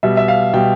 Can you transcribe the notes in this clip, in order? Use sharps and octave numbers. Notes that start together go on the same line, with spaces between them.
B2 G3 E5
E5
F5
B2 G3 G5